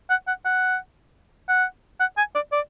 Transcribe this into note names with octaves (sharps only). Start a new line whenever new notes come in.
F#5
F#5
F#5
F#5
F#5
G#5
D5
D5